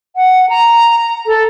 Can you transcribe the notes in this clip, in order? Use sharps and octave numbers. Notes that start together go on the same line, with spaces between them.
F#5
A#5
A4